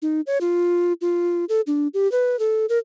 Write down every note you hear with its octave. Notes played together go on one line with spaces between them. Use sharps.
D#4
C#5
F4
F4
A4
D4
G4
B4
A4
A#4